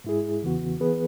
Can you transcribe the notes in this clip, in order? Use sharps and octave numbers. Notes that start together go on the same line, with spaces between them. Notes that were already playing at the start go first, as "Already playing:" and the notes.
G#2 G#3 E4 G#4
E2 C#3 E3 B3 F#4
E3 B3 G#4 B4